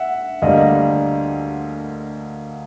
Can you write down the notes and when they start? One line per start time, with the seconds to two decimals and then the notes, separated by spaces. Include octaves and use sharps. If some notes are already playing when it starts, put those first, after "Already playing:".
Already playing: E5 F#5
0.42 D2 D3 G3 A#3 D#5 F5